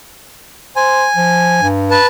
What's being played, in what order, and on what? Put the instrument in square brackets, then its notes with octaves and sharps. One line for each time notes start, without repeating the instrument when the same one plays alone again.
[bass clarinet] C5 [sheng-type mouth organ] G#5
[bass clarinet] F3
G2
[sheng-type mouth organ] B4 A5